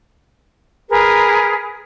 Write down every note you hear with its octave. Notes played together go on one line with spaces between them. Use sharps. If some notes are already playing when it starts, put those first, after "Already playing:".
G#4 A#4 B4